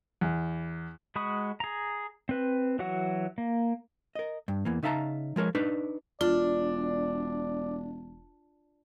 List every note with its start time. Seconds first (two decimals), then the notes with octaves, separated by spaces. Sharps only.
0.21 E2
1.16 G#3 F#4 B5 C#6 D#6
1.60 G#4 A#5
2.29 C4 B4
2.79 E3 F#3 F#4 F#5
3.38 A#3
4.15 A#4 D#5
4.48 G2
4.65 E2 E3 A#3
4.83 C#3 D#4 E5 F5 A5 A#5
5.36 F3 G#3 A#4 C#5
5.55 D4 D#4 B4 D5
6.21 E1 D4 F4 D5